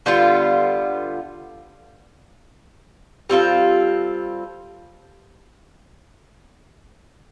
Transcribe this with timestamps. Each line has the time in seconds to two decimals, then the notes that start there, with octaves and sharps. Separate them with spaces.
0.06 D3 G3 B3 F4
3.30 G3 C4 F4 A4